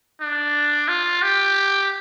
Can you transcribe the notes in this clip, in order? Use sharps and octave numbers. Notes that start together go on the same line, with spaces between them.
D4
F4
G4